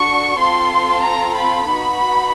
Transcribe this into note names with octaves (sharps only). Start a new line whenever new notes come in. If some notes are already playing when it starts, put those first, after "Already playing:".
Already playing: D4 F#4 A4 C#6
C4 F4 A4 C6
A#5
B5
B3 D#4 F#4